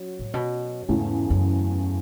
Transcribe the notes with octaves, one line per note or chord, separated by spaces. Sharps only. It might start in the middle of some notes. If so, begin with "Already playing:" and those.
Already playing: F#3 C#4
A2
B2
E2 G#2 C#3 E3 A3
F#2